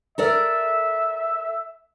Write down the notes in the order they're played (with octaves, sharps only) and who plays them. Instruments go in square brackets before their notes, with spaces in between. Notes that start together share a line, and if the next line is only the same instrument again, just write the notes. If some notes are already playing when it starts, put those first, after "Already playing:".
[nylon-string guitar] A4 A#4 D5 [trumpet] E5